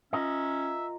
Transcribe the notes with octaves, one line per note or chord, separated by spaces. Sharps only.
C#4 F4 A#4 D#5 E5